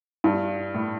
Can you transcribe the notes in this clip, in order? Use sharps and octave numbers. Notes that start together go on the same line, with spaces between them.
G2
A2